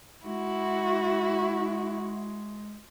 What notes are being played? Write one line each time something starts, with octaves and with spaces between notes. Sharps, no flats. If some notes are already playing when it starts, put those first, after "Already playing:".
G#3 E4 F#4